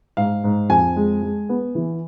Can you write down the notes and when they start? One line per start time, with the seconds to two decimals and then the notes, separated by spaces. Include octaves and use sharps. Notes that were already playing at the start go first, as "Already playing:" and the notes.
0.17 G#2 F5
0.44 G#2
0.69 F2 G#5
0.96 G#3
1.23 G#3
1.49 B3
1.75 E3